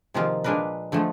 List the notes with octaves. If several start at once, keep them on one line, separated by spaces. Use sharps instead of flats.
C3 D#3 F3 G#3 A#3 F4
A#2 G#3 A#3 D4 A#4 B4
D3 F3 G#3 A3